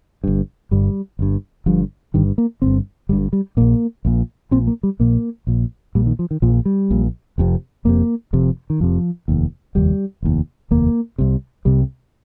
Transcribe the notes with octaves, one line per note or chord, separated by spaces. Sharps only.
G1 G2
G1 G2 G3
G1 G2
G1 G2 F3
G1 G2 D#3
A#3
G1 G2 C4
G1 G2 G3
G3
A#1 A#2 A#3
A#1 A#2
A#1 A#2 C4
A#3
G3
A#1 A#2 A#3
A#1 A#2
A#1 A#2 G3
D#3
F3
D#3
A#1 A#2 F3
G3
A#1 A#2
F1 F2 C3
F1 F2 C3 A#3
F1 F2 C3
D#3
F1 F2 C3 F3
F1 D#2
F1 D#2 G3
F1 D#2
F1 D#2 A#3
C2 C3
C2 C3 G3